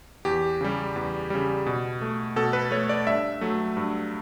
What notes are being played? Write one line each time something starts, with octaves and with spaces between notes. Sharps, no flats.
E2 G4
C#3 G3
E2
C#3 G3
B2
A3
B2 A4
B4
A3 C#5
D5
G2 E5
F#3 A3
G2